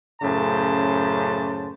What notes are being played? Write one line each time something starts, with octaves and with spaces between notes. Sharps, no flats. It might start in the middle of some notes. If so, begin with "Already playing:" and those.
F#2 A2 C#3 C5 A5